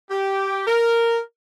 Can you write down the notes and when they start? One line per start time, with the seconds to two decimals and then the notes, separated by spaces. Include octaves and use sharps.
0.11 G4
0.67 A#4